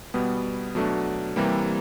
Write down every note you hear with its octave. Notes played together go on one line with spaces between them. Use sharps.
B2 G3 B3
B2 F#3 A3 D4
C3 E3 G3 A#3